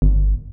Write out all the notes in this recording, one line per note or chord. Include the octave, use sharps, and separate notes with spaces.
G1